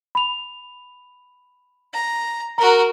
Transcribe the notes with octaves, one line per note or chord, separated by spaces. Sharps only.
B5 F7
A#5
F#4 A#4 A#5